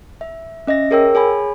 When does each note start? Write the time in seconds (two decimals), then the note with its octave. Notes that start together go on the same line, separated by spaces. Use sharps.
0.21 E5
0.67 C#4 D#5 E5 A#6
0.91 G#4 A#4 C#5 G5 E6
1.15 G#4 C#5 G#5 B5